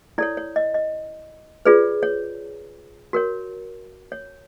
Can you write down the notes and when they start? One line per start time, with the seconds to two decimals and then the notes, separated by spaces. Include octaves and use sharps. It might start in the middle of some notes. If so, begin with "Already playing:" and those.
0.18 E4 A4 C#5 D5
0.37 C#5
0.56 D#5
0.74 D#5
1.65 F4 G#4 B4 D5
2.03 C#5
3.13 F#4 A#4 C#5
4.12 C#5